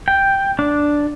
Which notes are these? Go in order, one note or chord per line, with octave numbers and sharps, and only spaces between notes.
G5
D4